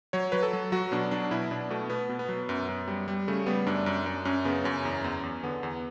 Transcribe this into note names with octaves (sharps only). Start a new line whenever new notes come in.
F#3 C#5
F#3 B4
A4
F#3
F#3 F#4
B2 D4
F#3 D4
B2 E4
B2 D4
B2 A3
B2 B3
B2
B3
F#3
F#2
F#2
G3
G3
C#3 A3
G3 B3
F#2 D4
F#2
F#2
F#2 C#4
C#3 B3
F#2 C#4
E2
E2
E2
D3 B3
E2